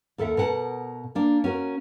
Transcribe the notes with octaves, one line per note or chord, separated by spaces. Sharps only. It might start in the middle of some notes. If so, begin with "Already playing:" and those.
D#2 A4 A#4 E5 F#5
B2 A#4 F#5 A5
A#3 D4
C#4 F#4 A#4